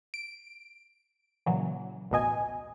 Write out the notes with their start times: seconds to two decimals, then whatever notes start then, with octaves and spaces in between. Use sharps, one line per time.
0.14 D7
1.46 A#2 C#3 E3 F#3
2.11 A1 D#2 B2 D#5 G#5